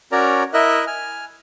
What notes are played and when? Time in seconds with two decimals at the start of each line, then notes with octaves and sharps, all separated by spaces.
0.12 C#4 F#4 A#4 C#5 D5 A#5
0.54 E4 A#4 D#5 E5 F#6
0.87 G#5 F6